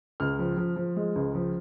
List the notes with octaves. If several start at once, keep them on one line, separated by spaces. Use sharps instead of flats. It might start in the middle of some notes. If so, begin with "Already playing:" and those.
C#2 F6
F3
F3
F3
G#3
C#2
F3